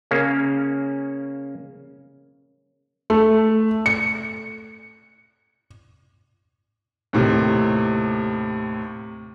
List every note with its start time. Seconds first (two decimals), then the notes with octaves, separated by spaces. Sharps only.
0.11 C#3 A#3 C#4
3.10 A3
3.86 C#7
7.13 D#2 A2 C3